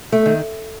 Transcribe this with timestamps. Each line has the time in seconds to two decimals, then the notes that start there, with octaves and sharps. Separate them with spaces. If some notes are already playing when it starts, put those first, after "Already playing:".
0.12 A3
0.26 D#3